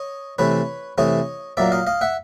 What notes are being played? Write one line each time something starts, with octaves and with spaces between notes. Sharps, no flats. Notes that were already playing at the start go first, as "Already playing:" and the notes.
Already playing: C#5 D#5
C3 E3 A3 B4 C#5
C3 E3 A3 C#5 D#5
A#2 F#3 A#3 D5 E5
D#5 F5
D#5 F5
E5 F#5